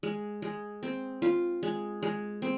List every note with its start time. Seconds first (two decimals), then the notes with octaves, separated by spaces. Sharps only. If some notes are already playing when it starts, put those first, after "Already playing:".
0.03 G#3
0.42 G#3
0.83 C4
1.22 F4
1.63 G#3
2.03 G#3
2.42 C4